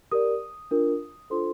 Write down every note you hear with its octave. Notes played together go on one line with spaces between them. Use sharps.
G4 A#4 D5 D#6
D4 F4 A#4
D4 F4 A4 C5 C6